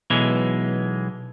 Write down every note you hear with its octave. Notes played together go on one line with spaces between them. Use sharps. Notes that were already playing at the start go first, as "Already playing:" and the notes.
B1 B2 E3 G#3